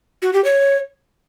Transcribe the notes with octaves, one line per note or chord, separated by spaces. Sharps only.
F#4
G4
C#5